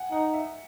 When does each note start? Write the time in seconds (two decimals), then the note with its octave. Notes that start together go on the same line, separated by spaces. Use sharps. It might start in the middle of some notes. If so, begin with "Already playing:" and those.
Already playing: F#5 G#5
0.12 D#4 F#5
0.34 E5